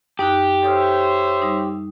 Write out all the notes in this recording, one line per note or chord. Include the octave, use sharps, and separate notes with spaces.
F#2 D#4 G4 F#6
A4 C5 C#5 E5 D#6 F6
G3 D#4